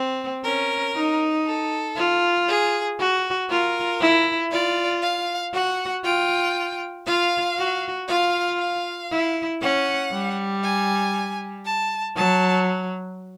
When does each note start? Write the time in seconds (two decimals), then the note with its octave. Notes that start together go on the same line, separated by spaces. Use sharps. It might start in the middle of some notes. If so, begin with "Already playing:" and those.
Already playing: C4
0.44 C#4 A#4
0.95 D#4
1.46 A4
1.96 F4
2.48 G#4
2.99 F#4
3.50 F4 A#4
4.01 E4
4.51 F4 D5
5.03 F5
5.53 F#4 F#5
6.04 F4 G5
7.06 F4 F5
7.58 F#4
8.08 F4 F5
8.59 F5
9.11 E4
9.62 C#4 F#5
10.12 G3
10.63 G#5
11.66 A5
12.16 F#3 A5